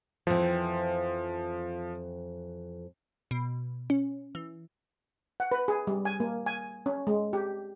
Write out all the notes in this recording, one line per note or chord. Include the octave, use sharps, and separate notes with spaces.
F2 E3 F3 C4
B2
C#4
E3
F#5
B4
G#4
G3
G#5
A#3
G#5
C#4
G#3
G4